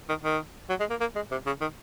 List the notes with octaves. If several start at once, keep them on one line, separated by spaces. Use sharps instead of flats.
D#3
D#3
F#3
G#3
A#3
A#3
G#3
C3
C#3
D#3